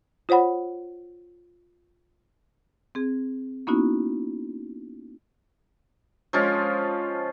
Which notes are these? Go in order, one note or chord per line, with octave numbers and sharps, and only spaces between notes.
F4 C5 C#5 F#5 B5
C4 G#4
A#3 B3 C#4 D#4 E4 F#4
F3 G#3 C#4 F4